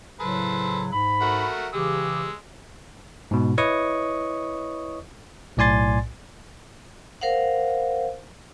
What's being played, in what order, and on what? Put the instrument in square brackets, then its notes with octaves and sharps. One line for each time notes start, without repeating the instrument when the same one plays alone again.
[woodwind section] A2 C#3 F#3 [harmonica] A4 B4 C5
[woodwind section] G#2 B5
[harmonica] A3 F#4 A#4
[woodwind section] C#3 E3 G4 [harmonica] G#3 E6
[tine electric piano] G#2 B2
E4 B4 C#5 D#5 C#6 D#6
B1 A2 D5 G#5 C6 A6
[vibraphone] A#4 C5 F5 F#5